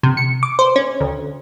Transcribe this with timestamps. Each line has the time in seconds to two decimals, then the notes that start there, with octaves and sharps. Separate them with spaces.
0.03 C3
0.17 C#7
0.43 D6
0.59 C5
0.76 C#4
1.00 D2